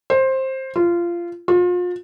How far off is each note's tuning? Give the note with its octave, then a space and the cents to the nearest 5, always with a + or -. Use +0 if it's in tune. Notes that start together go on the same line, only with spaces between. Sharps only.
C5 +15
F4 -20
F4 +35